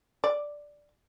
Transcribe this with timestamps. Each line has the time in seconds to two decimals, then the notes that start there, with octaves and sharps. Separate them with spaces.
0.24 D5